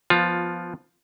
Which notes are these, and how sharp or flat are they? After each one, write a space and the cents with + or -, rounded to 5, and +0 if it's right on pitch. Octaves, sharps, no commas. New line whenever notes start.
F3 +0 B3 +0 F4 +15